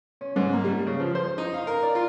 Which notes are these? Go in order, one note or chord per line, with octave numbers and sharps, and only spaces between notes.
C#4
G#2
A#3
G3
C#3
F3
C5
D#4
F5
A#4
D5
F4